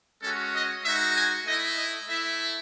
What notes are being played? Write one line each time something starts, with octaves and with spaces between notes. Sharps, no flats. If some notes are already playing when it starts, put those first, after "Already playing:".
G#3 C#4 F#4 A4
D#5
G#3 D#4 F#4 E5
G#5
A3 E4 D#5
D#5
A3 E4 E5